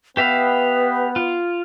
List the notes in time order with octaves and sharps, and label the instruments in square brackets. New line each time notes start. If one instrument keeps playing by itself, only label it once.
[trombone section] B3 [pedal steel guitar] G4 E5 F5 [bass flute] B4
[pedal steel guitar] F4